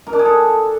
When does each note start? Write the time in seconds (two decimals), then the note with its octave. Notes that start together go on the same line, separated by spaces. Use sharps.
0.07 A#4
0.13 D4
0.19 G#4
0.25 A4